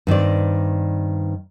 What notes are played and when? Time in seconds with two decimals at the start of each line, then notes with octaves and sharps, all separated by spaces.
0.07 G2 D#3 C4 D5